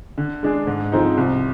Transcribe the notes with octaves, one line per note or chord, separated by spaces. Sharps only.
D3
G#3 D4 G#4
G#2
F3 G#3 C4 D#4
C2